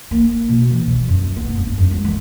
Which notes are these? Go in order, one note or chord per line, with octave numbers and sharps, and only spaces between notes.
A#3
B2
E3
G3
F#2
B3
G2
F#2
G#3
D#3